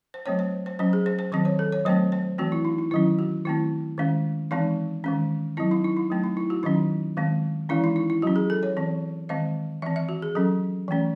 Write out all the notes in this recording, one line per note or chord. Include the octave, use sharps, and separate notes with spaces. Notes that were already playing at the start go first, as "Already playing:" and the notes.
C5
F#3 A3 C4 C#5
C5
C5
F#3 C#4 C5
G#4
C5
C5
D#3 F#3 C4 C5
C#5
A4
C#5
F#3 A3 C4 C5
C5
E3 A3 C4 F#4
E4
D#4
E4
D#3 F#3 C#4 E4
F#4
D#3 A3 C4 E4
D#3 G#3 C#4
E3 G#3 C4 D#4
D#3 G#3 C#4
F#3 C4 E4
D#4
E4
D#4
F#3 A3 C4
D#4
E4
F#4
D#3 F#3 C#4 D#4
D#3 G#3 C4
E3 G#3 C#4 E4
D#4
E4
E4
F#3 C#4 F#4
G#4
A4
C#5
E3 C4
D#3 G#3 C4 D#5
E3 C4 E5
E5
F#4
G#4
F#3 C#4 A4
E3 A3 C#4